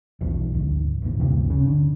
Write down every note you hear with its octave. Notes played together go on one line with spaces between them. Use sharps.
B1 E2 F3
G#1 D2
A1 D#2 A#2
G1 D2 C3 F3
C#3
D3